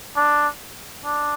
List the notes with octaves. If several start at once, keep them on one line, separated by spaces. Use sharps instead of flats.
D4
D4